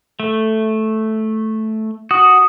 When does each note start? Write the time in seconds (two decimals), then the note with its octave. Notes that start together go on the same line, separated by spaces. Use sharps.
0.20 A3
2.11 F#4 D#6